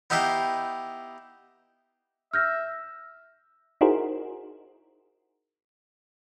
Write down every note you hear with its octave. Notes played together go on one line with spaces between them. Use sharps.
B3 D#4 E4 G4 F5 G5
E5 F6 G6 A#6
D#4 E4 F#4 G#4 A#4 C5